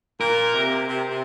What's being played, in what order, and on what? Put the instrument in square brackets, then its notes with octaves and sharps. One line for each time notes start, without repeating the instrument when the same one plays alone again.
[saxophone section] A#2 [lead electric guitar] A#4
[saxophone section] C3
C3
C3